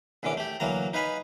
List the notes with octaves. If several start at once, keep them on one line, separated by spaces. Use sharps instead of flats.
A#1 D3 E3 C#4 D6
A3 G4
D2 E3 F#3 A#3 A#5
D#4 B4 F5 G#5 B5